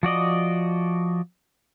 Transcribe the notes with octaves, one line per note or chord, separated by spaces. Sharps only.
F3 F#4 D5 D#5